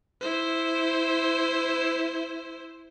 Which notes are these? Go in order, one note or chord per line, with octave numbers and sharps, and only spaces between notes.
E4 C5